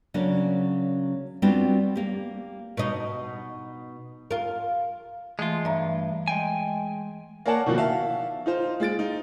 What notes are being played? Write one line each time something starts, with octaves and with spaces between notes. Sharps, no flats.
C#3 F#3 A#3 C#4 D4
G3 B3 C4 D4 F4 F#4
A#3 G4
B2 D#4
F4 A#4
E3 G#3 A3 F4
G2 E5 A#5
G#3 G5 G#5
A#3 A#4 C#5 D5 F#5 A5
B2 D#3 F3 F#4
E5 F5 A5
D#4 F4 C5
G#3 F4 A6 D7
D#4